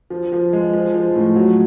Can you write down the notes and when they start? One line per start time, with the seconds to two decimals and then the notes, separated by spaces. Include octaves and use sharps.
0.10 F3
0.32 F3
0.53 G#3
0.73 F3
0.94 F3
1.15 A2
1.36 F#3